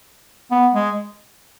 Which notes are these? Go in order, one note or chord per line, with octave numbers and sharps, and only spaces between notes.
B3
G#3